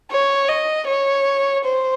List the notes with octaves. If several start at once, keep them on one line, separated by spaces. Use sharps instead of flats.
C#5
D#5
C#5
C5